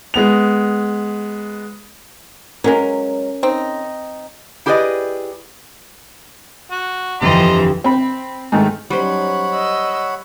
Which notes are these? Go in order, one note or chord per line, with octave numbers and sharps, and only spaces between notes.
G#3 B3 F7
F#3 G#3 C#4 A#4
C4 D#4
E4 G4 G#4 B4 D5 D#5
F#4
G1 F2 E3 F3 D#5 A#5 C6
C4 B5
G#2 D#3 A3
F#3 G3 C#4 D#4 C5 C#5 F#5 B5
D#5 E6